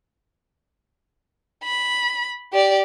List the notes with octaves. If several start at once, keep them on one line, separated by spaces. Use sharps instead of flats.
B5
G4 D5